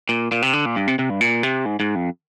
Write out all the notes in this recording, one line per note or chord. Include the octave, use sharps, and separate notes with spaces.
A#2
A#2
C3
D3
A#2
G2
C3
C3
G2
A#2
C3
G#2
G#2
F2